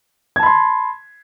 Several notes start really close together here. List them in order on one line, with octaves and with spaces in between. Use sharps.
G#6 A5 B5 C6